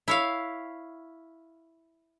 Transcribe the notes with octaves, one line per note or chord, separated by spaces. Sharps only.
E4 C#5 F5